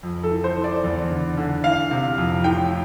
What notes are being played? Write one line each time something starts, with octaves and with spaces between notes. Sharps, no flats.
F2
A4
E3
C5
E3
D5
E2
D3
D3
E3 F5
C3
F2
A2 G5